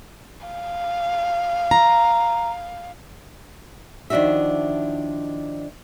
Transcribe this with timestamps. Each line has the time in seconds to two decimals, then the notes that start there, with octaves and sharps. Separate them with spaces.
0.47 F5
1.71 A#5
4.10 D#3 F3 D4 E4 F#4 E5